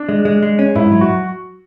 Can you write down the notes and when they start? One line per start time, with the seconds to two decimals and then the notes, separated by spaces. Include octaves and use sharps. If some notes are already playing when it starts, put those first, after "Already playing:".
Already playing: D4
0.09 G#3
0.25 G#3
0.42 G#3
0.59 C#4
0.75 G#2 E4
0.92 F#3
1.01 F#4